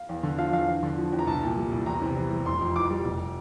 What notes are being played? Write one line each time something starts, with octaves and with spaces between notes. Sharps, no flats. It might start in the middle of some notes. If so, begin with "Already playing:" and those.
Already playing: F5
E2
D3
F3 F5
E2 F5
E2
D3
F3
E2
A#5
C2 A5
A#2
G3
C2
E2 A#5
C3
E3
G3
F1 C6
F2
E3 D6
G3
F1